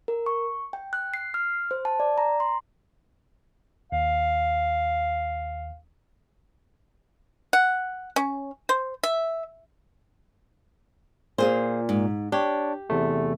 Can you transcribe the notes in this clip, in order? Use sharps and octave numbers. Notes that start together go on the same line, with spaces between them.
A#4
C#6
G5
F#6
C7
F6
C5
A5
D5
A#5
C6
D#2 F5
F#5
C#4
C5
E5
A#2 F4 G#4 C5
G#2
D4 G4 C#5
E2 C3 A3